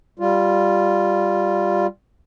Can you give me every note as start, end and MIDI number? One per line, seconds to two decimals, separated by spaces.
0.19 1.86 55
0.19 1.86 65